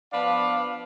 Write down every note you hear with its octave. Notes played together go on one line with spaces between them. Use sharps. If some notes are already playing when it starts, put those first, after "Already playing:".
F3 B3 D4 B4 D5 F5